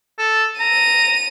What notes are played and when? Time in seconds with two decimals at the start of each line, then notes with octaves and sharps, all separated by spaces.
0.19 A4
0.59 A#5 D#7